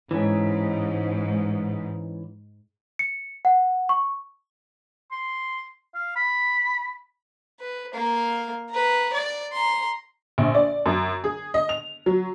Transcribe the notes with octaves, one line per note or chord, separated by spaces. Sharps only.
G#2 E3 C#4
C#7
F#5
C#6
C6
F5
B5
B4
A#3 F5
B4 A#5
D5
A#5 C6
A#1
D5
F#2
G#4
D#5
F7
F#3